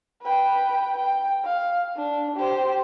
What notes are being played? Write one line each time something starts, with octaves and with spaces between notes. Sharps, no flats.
B4 G5
G5
F5
D4
G4 C5